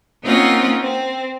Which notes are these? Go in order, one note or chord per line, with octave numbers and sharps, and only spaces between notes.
A#3 C4 C#4 D#4 F4 F#5
C4